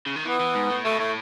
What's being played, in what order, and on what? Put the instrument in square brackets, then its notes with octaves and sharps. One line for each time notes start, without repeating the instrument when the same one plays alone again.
[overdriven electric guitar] C#3
D#3
[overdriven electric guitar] E3 [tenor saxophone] B3
[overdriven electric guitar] E3
G#2
A2
[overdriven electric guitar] B2 [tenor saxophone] A3
[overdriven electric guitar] A2 [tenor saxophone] A3